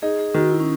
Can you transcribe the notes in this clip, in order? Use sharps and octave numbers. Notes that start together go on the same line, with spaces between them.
D#4 G#4
G#4
D#3 F#4
E4
C#4